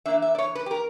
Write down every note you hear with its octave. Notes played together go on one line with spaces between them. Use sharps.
E3 A#3 D4 E5
E5
D5
C#5
B4
G4
A#4